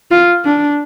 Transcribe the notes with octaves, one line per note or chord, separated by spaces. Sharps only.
F4
D4